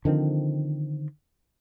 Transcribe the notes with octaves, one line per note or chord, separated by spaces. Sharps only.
D3 D#3 F3 C4